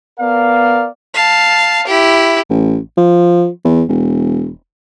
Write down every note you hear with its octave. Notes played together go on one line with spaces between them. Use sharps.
B3 A#4 D5 F5
F5 A5
E4 G4
A1
F3
E2
E1